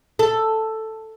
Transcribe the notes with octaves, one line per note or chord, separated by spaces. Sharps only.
A4